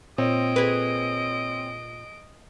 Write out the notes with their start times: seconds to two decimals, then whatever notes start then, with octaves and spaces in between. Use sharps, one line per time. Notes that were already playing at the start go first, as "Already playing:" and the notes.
0.18 A#2 C4 C#5 D#5 D7
0.56 G#4 B4